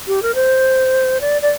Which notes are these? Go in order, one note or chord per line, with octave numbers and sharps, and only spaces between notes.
G4
A#4
C5
D5
D5